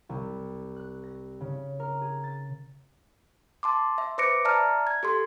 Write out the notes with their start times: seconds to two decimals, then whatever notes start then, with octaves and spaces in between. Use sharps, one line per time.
0.09 C2
0.76 F#6
1.03 A#6
1.41 C#3
1.80 A#4
2.02 G#4
2.23 A6
3.63 A5 C6 D6
3.98 E5
4.18 B4 C5 D6 A#6 C#7 D7
4.45 D5 E5 A5 A#5 F6
4.87 G#6
5.03 G4 A4 C6